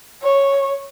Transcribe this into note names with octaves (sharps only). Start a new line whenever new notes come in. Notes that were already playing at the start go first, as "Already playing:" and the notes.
C#5